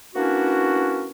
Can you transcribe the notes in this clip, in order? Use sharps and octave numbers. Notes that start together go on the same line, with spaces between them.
A#3 B3 C#4 D4 E4 F#4